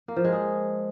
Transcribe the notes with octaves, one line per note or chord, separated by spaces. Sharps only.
A#3
F3
G#3
G#4